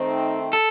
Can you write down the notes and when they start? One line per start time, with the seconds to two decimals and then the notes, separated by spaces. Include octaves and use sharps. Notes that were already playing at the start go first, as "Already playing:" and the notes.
Already playing: D#3 A3 C4 D#4
0.53 A4